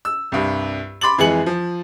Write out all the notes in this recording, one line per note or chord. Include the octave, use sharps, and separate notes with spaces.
E6
C2 G2
B5 C6 D6 A6 F#7
F2 E3 G#3 G#5 C#7 F#7
F3